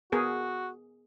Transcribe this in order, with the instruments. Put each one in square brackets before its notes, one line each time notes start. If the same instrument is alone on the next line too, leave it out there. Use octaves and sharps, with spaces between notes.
[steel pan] B3 G#4 A#4 [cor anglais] F#4